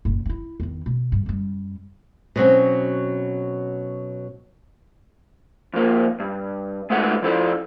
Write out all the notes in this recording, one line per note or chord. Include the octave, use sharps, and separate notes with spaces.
F#1 A#2
D4 E4
E2 D#3
B2
G2
F#2 G3
B2 F#3 C4 C#4
F2 A#3
G2
D#2 G#3 A3 F#4 B4 F#5
F3 E4 A4